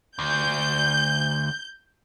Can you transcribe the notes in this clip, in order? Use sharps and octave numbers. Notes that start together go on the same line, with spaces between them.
D2 G6